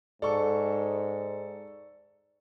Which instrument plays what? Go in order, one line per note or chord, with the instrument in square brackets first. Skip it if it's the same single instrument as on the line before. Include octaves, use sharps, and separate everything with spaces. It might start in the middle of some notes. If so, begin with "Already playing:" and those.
[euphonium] G#2 [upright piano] A4 C#6 [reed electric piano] D5